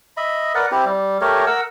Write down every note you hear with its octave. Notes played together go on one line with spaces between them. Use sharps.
D#5 E5 B5
A#4 B4 D5 F#5
C4 E4 G4
G3
A3 G4 A#4 C#5
A#4 F#5 E6